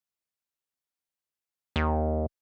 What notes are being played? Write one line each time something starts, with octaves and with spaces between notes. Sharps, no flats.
D#2